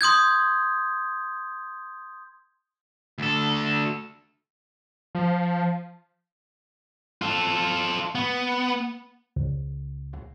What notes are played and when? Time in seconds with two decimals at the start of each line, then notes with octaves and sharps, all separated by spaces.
0.01 C6 D#6 G6 G#6
3.18 D2 A4
5.15 F3
7.22 F4 A4
8.15 B3
9.36 C#2